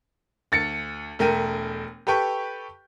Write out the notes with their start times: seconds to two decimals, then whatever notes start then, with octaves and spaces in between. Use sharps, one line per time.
0.52 D2 A6 C#7
1.19 E1 A3 A#4 G5 D#7
2.07 G4 A4 B4 G5 C#6